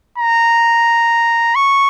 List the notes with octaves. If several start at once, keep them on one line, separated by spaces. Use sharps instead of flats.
A#5
C#6